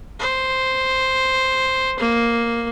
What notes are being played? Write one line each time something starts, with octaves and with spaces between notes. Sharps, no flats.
C5
A#3